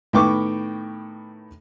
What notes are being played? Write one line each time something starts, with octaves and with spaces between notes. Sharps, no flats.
A2 D#3 B3 G5 C#6 D6